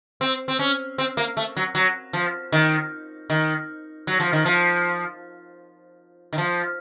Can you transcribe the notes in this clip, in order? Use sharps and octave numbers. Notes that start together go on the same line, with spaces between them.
C4
C4
C#4
C4
A#3
A3
F#3
F#3
F3
D#3
D#3
F#3
F3
D#3
F3
D#3
F3